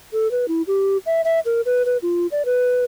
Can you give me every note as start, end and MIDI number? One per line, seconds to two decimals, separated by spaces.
0.13 0.30 69
0.31 0.48 71
0.48 0.62 64
0.67 0.97 67
1.06 1.21 76
1.25 1.40 76
1.46 1.61 70
1.66 1.85 71
1.86 1.97 71
2.02 2.27 65
2.32 2.42 74
2.45 2.84 71